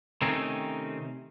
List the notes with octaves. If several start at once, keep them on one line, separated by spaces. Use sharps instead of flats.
C3 D#3 A3 C4 C#4 D#4